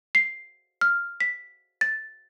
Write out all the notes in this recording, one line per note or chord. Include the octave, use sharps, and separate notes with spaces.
C7
F6
B6
A6